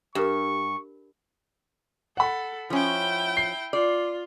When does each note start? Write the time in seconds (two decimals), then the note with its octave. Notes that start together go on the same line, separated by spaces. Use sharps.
0.15 G2 G4 A#4 C#6
2.17 A4 F#5 B5
2.70 F3 C#4 E4 G5
3.37 C7
3.73 F4 D5